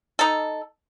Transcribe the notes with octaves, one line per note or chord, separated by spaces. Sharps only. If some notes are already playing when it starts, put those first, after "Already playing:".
D#4 A4